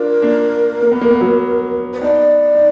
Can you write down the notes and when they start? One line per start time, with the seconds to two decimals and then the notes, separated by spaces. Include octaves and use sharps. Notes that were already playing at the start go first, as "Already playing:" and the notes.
Already playing: D4 F4 A#4
0.22 A#3 D4
0.82 A#3
0.92 B3
1.01 A#3
1.11 B3
1.21 F#3 A#3
1.94 B4
2.02 B3 D#4 D5
2.55 D#4